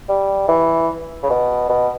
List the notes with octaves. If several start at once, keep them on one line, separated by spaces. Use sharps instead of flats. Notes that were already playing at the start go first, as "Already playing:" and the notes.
G3
E3
C#3
B2
B2